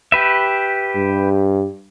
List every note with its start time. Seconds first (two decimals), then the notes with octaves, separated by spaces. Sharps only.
0.12 G4 B4 E5
0.95 G2